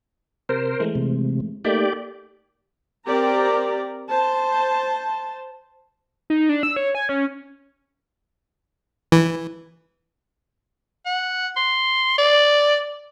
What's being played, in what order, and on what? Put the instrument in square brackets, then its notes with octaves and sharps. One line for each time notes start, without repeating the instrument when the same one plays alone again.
[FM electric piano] C3 [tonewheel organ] A#4 C5
[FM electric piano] E3 G#3 A3
[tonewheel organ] C3
[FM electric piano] A3 A#3 D#4 [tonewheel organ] G4 D5
[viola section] C4 G4 A#4 D5 A#5
C5 A5
[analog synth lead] D#4
D4
E6
C#5
G#5
C#4
[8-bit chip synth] E3
[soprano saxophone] F#5
C6
D5